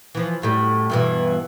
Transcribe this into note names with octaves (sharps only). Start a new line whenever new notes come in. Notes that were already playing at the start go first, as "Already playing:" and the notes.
E3 F3
F#2 A2 G3
G2 B2 E3